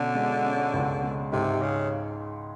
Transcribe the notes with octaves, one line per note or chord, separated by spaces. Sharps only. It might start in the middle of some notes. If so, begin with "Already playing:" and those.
Already playing: B2 D3 C#4
G#3
C#4
C#2
G#3
G#2 C3
C#3